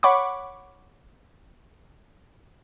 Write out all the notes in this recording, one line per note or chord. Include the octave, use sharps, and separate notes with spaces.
C#5 F#5 B5 C#6 D6